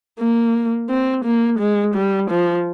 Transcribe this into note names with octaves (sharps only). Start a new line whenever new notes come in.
A#3
C4
A#3
G#3
G3
F3